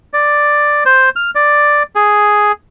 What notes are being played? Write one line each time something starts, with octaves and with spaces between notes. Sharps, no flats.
D5
C5
F6
D5
G#4